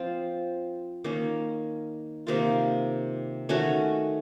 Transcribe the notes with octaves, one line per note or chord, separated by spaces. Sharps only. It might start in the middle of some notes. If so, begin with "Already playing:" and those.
Already playing: F3 C4 F4 C5
D#3 A#3 C#4
C3 D#3 A#3 F4
D#3 A3 C#4 F#4